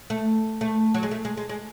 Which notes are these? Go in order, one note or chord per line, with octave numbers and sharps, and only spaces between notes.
A3
A3
F#3
G#3
A3
G#3
G#3
G#3